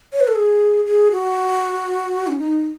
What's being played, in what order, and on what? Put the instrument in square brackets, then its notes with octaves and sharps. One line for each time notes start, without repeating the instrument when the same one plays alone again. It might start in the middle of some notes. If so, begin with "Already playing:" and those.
[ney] C#5
B4
A4
G#4
G#4
F#4
C#4
D#4